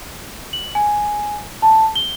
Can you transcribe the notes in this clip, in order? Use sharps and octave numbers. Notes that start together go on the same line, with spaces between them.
F#7
G#5
A5
G7